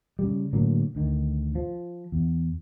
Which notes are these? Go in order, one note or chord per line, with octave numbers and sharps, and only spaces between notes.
C#3 G3
A2 D3 F#3 A#3
D2 D3 D#3
F3
E2